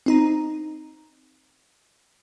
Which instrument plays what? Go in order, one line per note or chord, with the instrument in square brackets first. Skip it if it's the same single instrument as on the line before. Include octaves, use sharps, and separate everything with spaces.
[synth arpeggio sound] C4 D#4 A#5